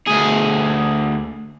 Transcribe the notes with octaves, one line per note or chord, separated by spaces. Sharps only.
D2 G#4